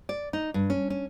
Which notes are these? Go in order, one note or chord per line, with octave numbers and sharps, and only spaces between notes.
D5
D#4
G2
C#4
C#4